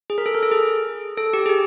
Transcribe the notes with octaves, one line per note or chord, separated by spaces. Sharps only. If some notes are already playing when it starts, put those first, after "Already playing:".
G#4
A#4
A4
A#4
A4
G#4
A4
G4
G#4
G4